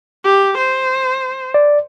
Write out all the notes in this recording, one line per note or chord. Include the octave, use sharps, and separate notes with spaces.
G4
C5
D5